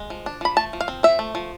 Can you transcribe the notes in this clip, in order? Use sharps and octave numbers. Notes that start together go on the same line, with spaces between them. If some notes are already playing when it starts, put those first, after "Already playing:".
Already playing: G#3
F3
D4
F3 B5
A3 A5
F3
F5
C4
F3 E5
A3
F3